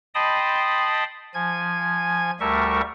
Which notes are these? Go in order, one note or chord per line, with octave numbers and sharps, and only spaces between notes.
D#5 G5 A5 B5 C6 D#6
F3 G#5 G#6
D2 G3 A3 A#4 E5 C#6